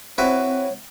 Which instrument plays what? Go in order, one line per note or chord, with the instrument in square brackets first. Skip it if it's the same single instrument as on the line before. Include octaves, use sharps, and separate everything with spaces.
[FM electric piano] C4 [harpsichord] E4 F#4 B4 [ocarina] C#5